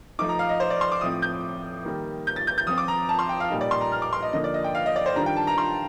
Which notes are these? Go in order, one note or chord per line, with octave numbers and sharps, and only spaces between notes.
F3 A3 D#4 D6
A#5
F5
D#5
C5
D5
C6
D6
A2 F3 C4 D#6
G6
D#3 G3 A#3
G6
A6
G6
G6
F3 C4 F4 D#6
D6
A#5
A5
C6
G5
F5
A#2 G3 A#3 D#4
D5
C6
A#5
F6
D6
C6
D#5
D3 F3 A#3 D#4 D#5
D5
D#5
G5
F5
D#5
D5
C5
D#3 G3 D4 F4 A#5
G5
A5
A#5
C6